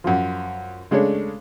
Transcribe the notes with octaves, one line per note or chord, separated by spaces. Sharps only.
F#2 F3
C#3 G#3 A3 D4 C#5